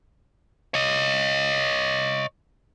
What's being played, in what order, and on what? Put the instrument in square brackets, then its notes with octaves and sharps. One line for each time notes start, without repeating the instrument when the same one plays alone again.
[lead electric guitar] C#5 D#5